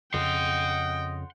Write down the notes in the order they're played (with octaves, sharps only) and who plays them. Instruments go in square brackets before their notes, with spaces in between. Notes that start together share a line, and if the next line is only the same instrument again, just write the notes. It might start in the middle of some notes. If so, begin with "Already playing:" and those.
[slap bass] F2 C#3 [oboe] D#5 [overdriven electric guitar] F#5 C6 [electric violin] G5